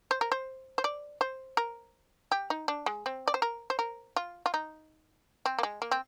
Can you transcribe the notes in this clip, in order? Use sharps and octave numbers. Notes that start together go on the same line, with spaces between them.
C5
A#4
C5
C5
D5
C5
A#4
G4
D#4
D4
G#3
C4
D5
C5
A#4
C5
A#4
F4
F4
D#4
C4
A#3
G#3
A#3
C4